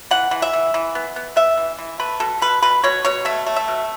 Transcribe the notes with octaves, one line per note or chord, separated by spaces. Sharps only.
E3 F#5
E3
E5
E3
E3
B3
B3
B3 E5
E3
E3
A3 B4
B2 A4
B2 B4
B2 B4
B2 C#5
B2 C#5
A3 E5
A3
E5
B2